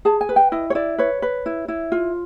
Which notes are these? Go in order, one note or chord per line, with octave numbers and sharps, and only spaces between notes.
G#4 A5
G#5
B4
G5
E4 D#5
C#5
E4 D5
B4 C#5
B4
E4
E4
F4